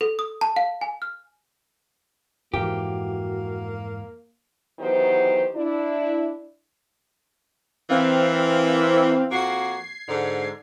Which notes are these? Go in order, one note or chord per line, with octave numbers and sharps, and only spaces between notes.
A4
D#6
A5
F5
G#5
F6
F2 G#2 E3 A#3 F#4 G4
D#3 E3 F#3 B3 G4 C5
D4 E4
E3 C4 A#4 F5
F2 A#3 F#4 G#6 C7
G#2 D3